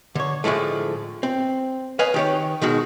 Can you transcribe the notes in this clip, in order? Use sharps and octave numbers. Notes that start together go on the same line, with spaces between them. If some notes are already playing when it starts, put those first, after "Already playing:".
D3 C#5
A2 D3 F3 G#3 A3
C4
B4 C#5 D#5 F5 G#5
D#3 G4 C#5
B2 D#3 G#3 F#4